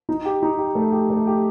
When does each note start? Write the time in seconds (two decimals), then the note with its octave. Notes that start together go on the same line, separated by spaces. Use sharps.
0.09 D#4
0.25 G4
0.43 D#4
0.59 G4
0.75 A3
0.92 G4
1.10 A3
1.27 G4